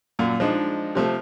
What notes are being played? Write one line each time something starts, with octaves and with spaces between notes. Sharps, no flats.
F#2 A#2
F3 G#3 D4 D#4
C3 F3 A3